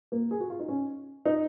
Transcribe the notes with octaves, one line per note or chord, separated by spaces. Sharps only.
A#3
G#4
F#4
F4
D#4
C#4
D#4